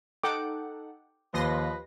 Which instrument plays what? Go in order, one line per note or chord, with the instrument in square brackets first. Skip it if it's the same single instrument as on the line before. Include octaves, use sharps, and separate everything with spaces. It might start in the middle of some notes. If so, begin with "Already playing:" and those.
[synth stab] D#4 A4 F#5 [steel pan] G5 D6
[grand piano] D#2 [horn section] F3 B4 [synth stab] D#5 C6 A#6